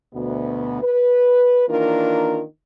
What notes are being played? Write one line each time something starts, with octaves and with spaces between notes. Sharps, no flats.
D2 B2 B3
B4
D#3 E3 A#3 D4 F4 A#4